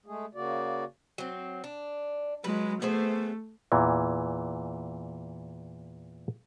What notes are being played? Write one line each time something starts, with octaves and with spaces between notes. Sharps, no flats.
G#3 A3 G#4
C#3 A#3 F#4 D5
F#3 C4
D4
F#3 G#3 B4
A3 B3 G#4 C5
E2 A#2 E3